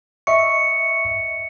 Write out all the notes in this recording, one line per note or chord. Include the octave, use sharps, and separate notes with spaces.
D#5 E5 C#6 C#7